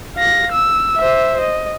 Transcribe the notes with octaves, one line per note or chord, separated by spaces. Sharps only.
F5 A#6
E6
C5 E5
D#5